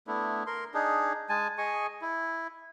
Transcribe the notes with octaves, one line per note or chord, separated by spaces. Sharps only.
A3 B3 D4 E4
A#4 C6
D4 D#4 G#4
G#3 G#5 A5
G#4 D#5 G#5 C#6
E4